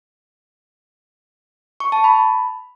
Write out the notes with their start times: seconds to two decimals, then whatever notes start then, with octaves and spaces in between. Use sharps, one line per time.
1.80 C#6
1.92 A5
2.04 B5